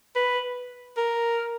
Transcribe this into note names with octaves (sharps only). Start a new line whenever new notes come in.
B4
A#4